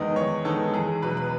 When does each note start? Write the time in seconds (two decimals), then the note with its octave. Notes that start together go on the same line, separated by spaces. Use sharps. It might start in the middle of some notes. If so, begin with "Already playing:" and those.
Already playing: E2 D#3 G#3 B3 D#4 D#5
0.16 E2 C#5
0.45 D#3 G#3 B3 D#4 A4
0.74 E2 G#4
1.02 B2 F#3 B4
1.17 B4